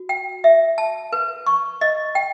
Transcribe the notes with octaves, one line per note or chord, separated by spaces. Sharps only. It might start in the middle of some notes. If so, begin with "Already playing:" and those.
Already playing: F#4
G5
E5
A5
B4
C#6
D#5
G5